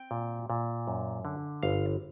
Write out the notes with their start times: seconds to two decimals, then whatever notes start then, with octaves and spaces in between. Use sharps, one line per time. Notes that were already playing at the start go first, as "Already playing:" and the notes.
Already playing: C4 G5
0.11 A#2
0.50 A#2
0.88 F#2
1.25 D3
1.63 G1 F5